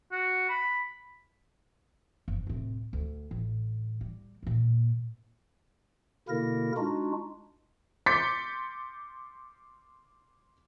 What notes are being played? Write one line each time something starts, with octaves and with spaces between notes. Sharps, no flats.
F#4
B5
F#1
D1 C3
D2
A1
G3
A#2 E3
B2 D3 A#3 E4 A#4 A#6
G#3 D4 D#4 F4 F#4
C6 D6 G6 A6 B6 C#7